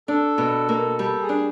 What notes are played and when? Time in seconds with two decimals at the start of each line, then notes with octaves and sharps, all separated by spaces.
0.08 D4 A4
0.38 B2
0.69 A#3
0.99 G3 A4
1.22 G#4
1.29 D4